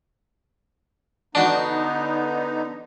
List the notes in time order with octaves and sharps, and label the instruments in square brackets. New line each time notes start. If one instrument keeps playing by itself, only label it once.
[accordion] D3 B3 D#4 [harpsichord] D4 F#4